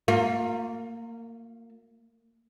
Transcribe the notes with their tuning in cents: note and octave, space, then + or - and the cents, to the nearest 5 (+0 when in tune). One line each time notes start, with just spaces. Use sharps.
A#3 -20 F4 +30